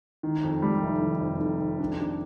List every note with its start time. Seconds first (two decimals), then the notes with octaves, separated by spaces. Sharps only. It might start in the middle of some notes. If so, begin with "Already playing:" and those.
0.23 D#3
0.43 F2
0.62 G3
0.82 F1
1.01 D#3
1.21 F2
1.41 D#3
1.60 F2
1.80 D4
2.00 D4